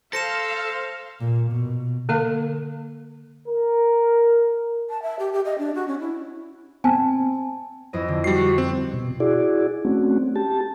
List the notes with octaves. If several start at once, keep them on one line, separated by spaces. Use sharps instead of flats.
A4 C5 F5 A#6 C#7 E7
A#2
B2
D3 A#3 A#4 F5
A#4
A5
E5
G4
G4
D#5
D4
F#4
C#4
E4
C4 G#5 A5
F2 E4 D#5
D3
G3 F#4 C7
C4
B2
E4 F#4 G#4 D5
A3 C4 C#4 F#4
G4 A5